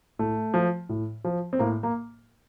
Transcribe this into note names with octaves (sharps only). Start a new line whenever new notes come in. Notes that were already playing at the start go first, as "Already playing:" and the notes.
A2 A3
F3
A2
F3
C4
A2 A#3
A#3